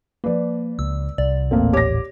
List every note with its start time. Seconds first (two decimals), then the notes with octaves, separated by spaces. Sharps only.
0.24 F3 A#3 B4 D5
0.79 C#2 E6
1.18 C2 D5
1.51 D#1 A1 A3 A#3 C4
1.73 G4 C#5 D6 A#6